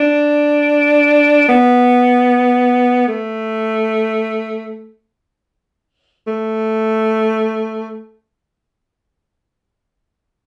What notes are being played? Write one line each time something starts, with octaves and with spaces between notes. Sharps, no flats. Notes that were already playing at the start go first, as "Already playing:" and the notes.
Already playing: D4
B3
A3
A3